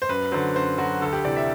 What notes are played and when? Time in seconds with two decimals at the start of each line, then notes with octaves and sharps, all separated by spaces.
0.02 C5
0.09 F#2 B4
0.32 D3 F#3 C5
0.55 F#2 C5
0.78 D3 F#3 F#4
1.02 D2 A4
1.13 G4
1.25 C3 E3 D5
1.37 E5